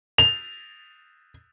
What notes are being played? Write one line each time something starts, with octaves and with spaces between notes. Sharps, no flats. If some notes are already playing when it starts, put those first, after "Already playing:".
F7